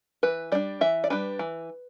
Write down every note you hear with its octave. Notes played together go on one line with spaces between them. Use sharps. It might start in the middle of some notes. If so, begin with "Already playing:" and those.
E3 B4
G3 D4 D5
E3 E5
D5
G3 D4 B4
E3